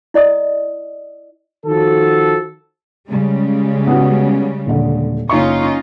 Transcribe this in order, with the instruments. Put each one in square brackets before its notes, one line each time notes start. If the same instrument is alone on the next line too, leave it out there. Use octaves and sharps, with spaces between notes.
[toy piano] E4 D5 D#5 D#6
[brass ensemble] D#3 F3 F#4 A4
[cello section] C#3 G3 G#3
[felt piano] B3 F#4
D#1 D3
[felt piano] F#1 C#6 [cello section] C#4 D#4 F4